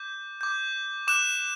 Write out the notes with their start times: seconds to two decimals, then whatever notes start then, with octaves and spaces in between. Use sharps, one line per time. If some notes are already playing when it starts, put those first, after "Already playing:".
Already playing: D6 G6
0.41 D6 G6
1.08 D6 F#6 E7